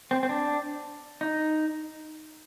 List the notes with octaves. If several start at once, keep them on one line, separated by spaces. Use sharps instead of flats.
C4
C4
D4
D#4